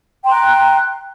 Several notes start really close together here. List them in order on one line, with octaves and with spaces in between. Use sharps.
G5 C6 A#5 F#6